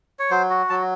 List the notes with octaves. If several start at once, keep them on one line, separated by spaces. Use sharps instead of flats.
C#5
F#3 C5
F#4
F#3 A5